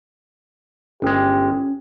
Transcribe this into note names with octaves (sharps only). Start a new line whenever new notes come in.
G1 G#3 C#4 G4